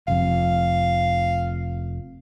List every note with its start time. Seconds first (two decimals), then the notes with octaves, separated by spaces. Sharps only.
0.08 F1 F2 F5